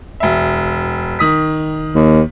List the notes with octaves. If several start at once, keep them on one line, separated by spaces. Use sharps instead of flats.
E1 E5
D#3 D#6 B6
D#2